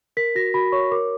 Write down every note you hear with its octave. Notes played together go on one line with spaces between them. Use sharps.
A#4 B6
F#4 A#6
F#4 B5
C#5 C#6
A#4 D6